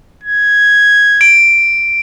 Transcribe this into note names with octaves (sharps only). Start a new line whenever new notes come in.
G#6
D7